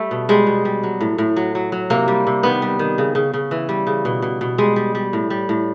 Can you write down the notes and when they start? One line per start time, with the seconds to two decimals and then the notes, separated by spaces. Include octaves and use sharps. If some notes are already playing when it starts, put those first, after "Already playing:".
Already playing: G3 A3
0.11 B2
0.29 G3 G#3
0.47 B2
0.65 G3
0.83 F#3
1.01 A2
1.18 A2
1.36 F#3
1.55 F#3
1.72 F#3
1.90 C3 A#3
2.08 G3
2.27 C3
2.43 D#3 B3
2.62 G3
2.79 D#3
2.98 C#3
3.15 C#3
3.34 C#3
3.51 E3
3.69 G3
3.87 C#3
4.05 B2
4.22 B2
4.41 B2
4.58 G3 G#3
4.76 G3
4.95 G3
5.13 A2
5.30 G3
5.49 A2